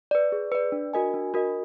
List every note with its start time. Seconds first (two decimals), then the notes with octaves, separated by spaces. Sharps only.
0.11 B4 D5
0.32 G#4
0.52 B4 D5
0.72 D4
0.94 F#4 A#4 D#5 G#5
1.14 D4
1.34 F#4 A#4 D#5 G#5